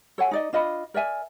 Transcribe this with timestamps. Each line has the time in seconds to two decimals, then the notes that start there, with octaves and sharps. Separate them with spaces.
0.18 A4 C#5 F#5 G#5
0.31 D#4 D5 D#5
0.53 D4 F4 D#5 B5
0.94 A#4 D5 E5 G#5